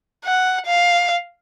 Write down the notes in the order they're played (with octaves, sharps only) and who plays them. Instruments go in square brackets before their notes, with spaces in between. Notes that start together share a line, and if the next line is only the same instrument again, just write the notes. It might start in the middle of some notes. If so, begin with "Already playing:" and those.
[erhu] F#5
F5